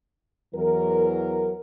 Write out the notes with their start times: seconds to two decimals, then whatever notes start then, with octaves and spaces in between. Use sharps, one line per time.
0.54 E2 E3 F#3 A#4